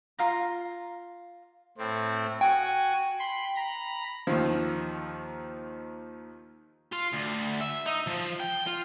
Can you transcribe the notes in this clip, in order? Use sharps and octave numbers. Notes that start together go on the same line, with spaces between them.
F4 F5 A#5
A2 C4
F#4 G5 G#5
B5 C6
A#5 B5
D#2 D#3 F3
F4
D2
E5
D#4
F3
G5
F4